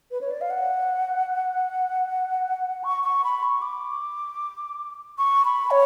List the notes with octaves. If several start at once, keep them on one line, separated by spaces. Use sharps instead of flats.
B4
C#5
D5
F5
F#5
C#6
C#6
B5
C#6
D6
C#6
B5
C#5